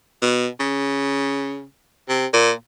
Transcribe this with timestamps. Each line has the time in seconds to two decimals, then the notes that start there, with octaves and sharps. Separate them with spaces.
0.22 B2
0.60 C#3
2.09 C3
2.34 A#2